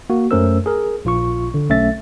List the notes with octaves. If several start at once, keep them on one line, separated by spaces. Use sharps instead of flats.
A#3 F#4
F#2 A3 C#4 A#4 C5 E6
G#4 A#4
A#1 F4 C#6
D3
B1 A3 C#4 E5 A6